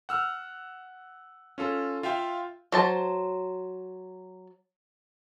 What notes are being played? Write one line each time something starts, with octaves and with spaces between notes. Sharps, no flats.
F#5 E6 F6
C#4 F4 A4
F4 E5 F5 G5
F#3 C5 A5